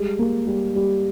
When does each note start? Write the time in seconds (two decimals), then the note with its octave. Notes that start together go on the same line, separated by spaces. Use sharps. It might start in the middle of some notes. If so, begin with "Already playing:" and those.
Already playing: G3 G#3
0.19 A#3
0.47 G3
0.75 G3